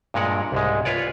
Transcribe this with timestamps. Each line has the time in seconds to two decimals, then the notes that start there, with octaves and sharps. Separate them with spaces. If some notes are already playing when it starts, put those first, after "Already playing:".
0.14 G2 A#2 G#3 A#4 F#5
0.52 C2 G#2 G#3
0.85 F4 B4 C#5 D5